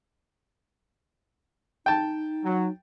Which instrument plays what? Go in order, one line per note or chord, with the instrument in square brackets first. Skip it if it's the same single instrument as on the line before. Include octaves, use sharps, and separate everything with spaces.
[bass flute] D#4 [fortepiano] G5 A5
[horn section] F#3